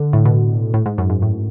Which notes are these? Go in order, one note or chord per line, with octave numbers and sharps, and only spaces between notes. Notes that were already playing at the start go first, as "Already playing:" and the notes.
Already playing: D3
A2
B2
A2
G#2
F#2
G#2
A2